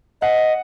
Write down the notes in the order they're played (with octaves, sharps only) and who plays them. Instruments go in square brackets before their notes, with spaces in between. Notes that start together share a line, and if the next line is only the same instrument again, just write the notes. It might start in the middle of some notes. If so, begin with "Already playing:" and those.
[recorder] D#5 [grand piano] F#5